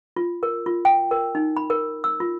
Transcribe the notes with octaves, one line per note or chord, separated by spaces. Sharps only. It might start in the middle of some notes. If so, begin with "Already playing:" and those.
F4
A#4
F4
G5
A#4
D#4
B5
A#4
E6
F4